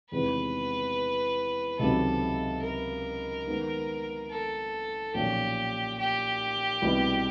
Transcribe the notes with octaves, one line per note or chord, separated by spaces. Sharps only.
E2 C3 D#3 G#3 B3 B4
C#2 C3 D#3 F#3 A4
A#4
D#3 G#3 B3
A4
B1 A#2 F3 A#3 C#4 G4
G4
C2 B2 G3